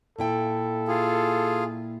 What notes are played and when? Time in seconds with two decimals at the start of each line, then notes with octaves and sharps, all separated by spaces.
0.19 A#2 E4 A4 G5
0.88 F4 G#4